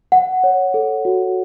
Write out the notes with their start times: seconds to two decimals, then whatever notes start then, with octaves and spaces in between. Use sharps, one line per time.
0.12 F#5
0.44 C#5
0.74 A4
1.05 F#4